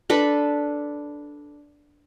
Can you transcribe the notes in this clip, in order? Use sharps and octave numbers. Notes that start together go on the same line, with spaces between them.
D4 A4 B4